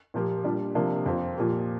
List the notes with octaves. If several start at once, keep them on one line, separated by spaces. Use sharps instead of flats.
A#2 F3 A#3 G4
A#2 G3 D4
C3 F3 A#3 D4
F2 F3 C4 F4
A#2 F3 A#3 G4